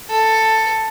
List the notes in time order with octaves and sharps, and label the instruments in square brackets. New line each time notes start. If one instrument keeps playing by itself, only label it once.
[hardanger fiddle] A4